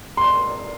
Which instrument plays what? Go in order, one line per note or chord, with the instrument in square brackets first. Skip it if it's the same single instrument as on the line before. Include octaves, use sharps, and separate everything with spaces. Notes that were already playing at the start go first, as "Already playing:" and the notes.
[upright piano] C6